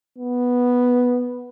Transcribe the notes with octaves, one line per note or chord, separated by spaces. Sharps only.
B3